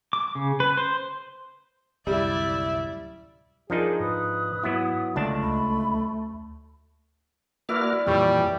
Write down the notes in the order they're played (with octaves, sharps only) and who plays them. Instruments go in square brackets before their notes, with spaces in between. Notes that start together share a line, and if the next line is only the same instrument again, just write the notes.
[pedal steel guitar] D6
C#3
B4
C5
[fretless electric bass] D1 C2 F#2 [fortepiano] G3 [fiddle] E4 D5 [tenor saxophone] E5
[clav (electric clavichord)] F3 D4 D#4 [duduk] G#4 [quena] A#4
[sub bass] G#2 [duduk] B4 [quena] D#6
[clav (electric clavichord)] F#3 B3 E4
[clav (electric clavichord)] C#2 D4 A5 [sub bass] D3 [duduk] A3 [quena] D#5
[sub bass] D2 [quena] B5
[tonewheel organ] A#3 F#4 F6 [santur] E4 B4 D5
[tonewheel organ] F2 A#2 E3 [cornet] G3 [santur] C#5 D5 G5